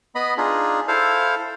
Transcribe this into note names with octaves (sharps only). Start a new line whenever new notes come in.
B3 D#5 B5
D4 D#4 F4 G#4
E4 A4 C5 F5